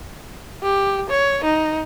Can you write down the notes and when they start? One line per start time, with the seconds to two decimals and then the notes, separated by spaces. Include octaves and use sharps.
0.63 G4
1.10 C#5
1.44 D#4